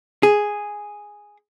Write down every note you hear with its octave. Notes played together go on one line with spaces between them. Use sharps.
G#4